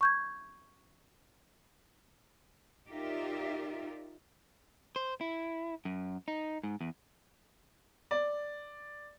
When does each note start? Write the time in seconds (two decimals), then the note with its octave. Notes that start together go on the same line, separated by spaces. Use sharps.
0.01 C#6 G6 G#6
2.89 D#4 F4 G4 A#4 D5 E5
4.96 C5
5.21 E4
5.85 F#2
6.28 D#4
6.64 G#2
6.81 E2
8.11 D5